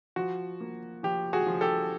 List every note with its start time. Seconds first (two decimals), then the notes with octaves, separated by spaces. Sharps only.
0.16 F3 F#4
0.60 A#3
1.03 F3 G4
1.33 F#4 G#4
1.47 F3
1.61 G4 A4